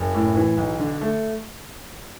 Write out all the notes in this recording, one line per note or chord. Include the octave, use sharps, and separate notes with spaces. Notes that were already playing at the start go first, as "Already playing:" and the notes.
Already playing: F#1
A2
E3
B1
D3
A3